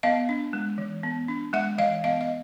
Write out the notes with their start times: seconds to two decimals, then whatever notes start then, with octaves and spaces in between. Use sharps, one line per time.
0.03 B3 D#5 F5
0.29 D4
0.53 G#3
0.78 E3
1.03 B3
1.28 D4
1.53 G#3 E5 F#5
1.78 E3 D#5 F5
2.04 B3 D#5 F5
2.21 D#5